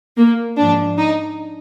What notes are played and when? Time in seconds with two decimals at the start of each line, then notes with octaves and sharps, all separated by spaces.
0.17 A#3
0.58 G#2 F3 D4
0.98 D#4